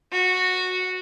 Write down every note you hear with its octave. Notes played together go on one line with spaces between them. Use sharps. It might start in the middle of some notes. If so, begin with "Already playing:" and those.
F#4